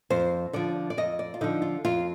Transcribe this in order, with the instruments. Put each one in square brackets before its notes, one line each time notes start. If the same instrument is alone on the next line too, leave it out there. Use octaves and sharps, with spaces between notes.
[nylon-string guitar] F2 C5
D3 F3 D5
D5
F2 D#5
D5
F4
D3 F3 D#4
F4
F2 F4